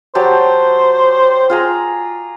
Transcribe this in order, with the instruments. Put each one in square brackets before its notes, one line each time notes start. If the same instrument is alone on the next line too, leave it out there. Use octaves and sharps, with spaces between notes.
[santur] F#3 G4 A5 [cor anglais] C5
[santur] F4 G#4 A#5